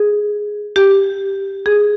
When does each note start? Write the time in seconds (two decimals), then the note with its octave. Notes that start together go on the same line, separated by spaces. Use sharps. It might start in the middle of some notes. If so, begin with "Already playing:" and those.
Already playing: G#4
0.76 G4
1.66 G#4